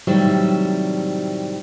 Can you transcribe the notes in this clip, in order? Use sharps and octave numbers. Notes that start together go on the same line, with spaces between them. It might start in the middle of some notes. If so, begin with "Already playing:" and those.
A2 C3 D#3 F#3 G3 E5